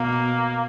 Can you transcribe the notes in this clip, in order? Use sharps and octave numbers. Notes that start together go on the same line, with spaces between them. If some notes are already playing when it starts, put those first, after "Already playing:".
Already playing: B2 A#3